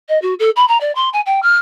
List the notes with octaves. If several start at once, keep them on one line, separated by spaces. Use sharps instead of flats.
D#5
F#4
A4
B5
A#5
D5
C6
G#5
G5
F6